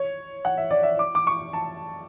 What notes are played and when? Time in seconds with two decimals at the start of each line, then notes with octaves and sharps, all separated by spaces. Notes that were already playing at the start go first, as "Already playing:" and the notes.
Already playing: C#5
0.45 F#5
0.57 E5
0.70 D5
0.83 E5
0.99 D6
1.15 D6
1.27 C#6
1.53 A5